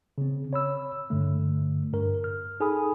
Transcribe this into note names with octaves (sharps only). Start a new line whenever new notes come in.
C#3 C4
C#5 B5 E6
G2 D3 A3
G2 A#4
F6
D#4 G#4 A4 G#5 B5 D#6